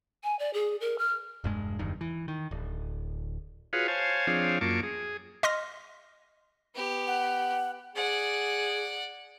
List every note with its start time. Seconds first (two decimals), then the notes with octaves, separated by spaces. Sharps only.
0.24 G#5
0.39 D5
0.53 G#4
0.81 A#4
0.98 F6
1.44 E1 G2 G#3
1.79 F#1 E2 G2 D#3
2.01 E3
2.28 D#3
2.51 D1
3.73 F4 F#4 G#4 B4 C#5 F5
3.88 C5 C#5 F5 G#5 A5
4.27 F3 C4 D4 G#4 C#5 F5
4.61 F#2 A#3 F4 A5 C#6 D6
4.83 G#4
5.43 D#5 C6 F6 A#6
6.75 B3 G4
7.07 F#5
7.95 G#4 D5 F#5